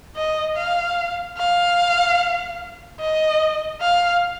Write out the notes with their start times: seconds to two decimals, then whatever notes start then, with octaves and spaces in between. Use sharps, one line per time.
0.16 D#5
0.57 F5
1.38 F5
3.00 D#5
3.81 F5